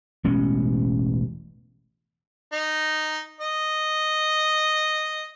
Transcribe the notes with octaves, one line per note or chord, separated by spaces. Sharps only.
E1 A1 G#3 C#4
D#4
D#5